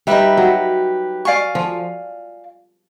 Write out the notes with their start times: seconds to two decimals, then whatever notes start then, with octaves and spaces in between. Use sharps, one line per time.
0.07 G3 D#4 G4 B4 E5
0.37 F#3
1.25 D5 F5 G#5 C#6
1.55 F3